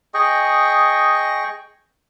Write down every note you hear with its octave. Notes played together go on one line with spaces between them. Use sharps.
G#4 D#5 G5 C#6